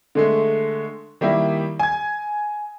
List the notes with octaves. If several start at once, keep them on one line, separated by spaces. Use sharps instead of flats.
D3 G#3 A3
D#3 G3 A#3 E4
G#5 G#6